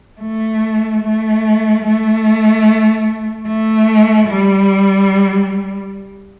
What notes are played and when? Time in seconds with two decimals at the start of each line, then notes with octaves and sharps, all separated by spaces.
0.21 A3
1.03 A3
1.84 A3
3.47 A3
4.28 G3